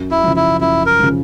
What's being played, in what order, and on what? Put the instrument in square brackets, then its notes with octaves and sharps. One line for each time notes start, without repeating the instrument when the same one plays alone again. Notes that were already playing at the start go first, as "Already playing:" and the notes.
Already playing: [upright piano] F#2
[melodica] E4
[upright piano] C#3 F3
[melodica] E4
[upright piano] F#2 [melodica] E4
[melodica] A#4
[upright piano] C#3 F3